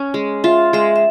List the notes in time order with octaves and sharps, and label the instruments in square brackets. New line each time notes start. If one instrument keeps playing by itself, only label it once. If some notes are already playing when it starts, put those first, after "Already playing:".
Already playing: [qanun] C#4
G#3
[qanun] F4 [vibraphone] E5
[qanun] G#3 [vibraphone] E5
[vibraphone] E5